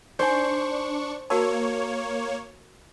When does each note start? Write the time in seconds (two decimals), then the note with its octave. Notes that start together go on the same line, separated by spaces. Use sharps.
0.19 D4 D#4 C5 C#5 G#5 C#6
1.30 A#3 F#4 A#4 C#5 A5